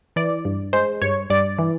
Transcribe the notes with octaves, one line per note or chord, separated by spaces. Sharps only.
E3 D5
G2
G#3 C5
G2 C#5
G2 D5
E3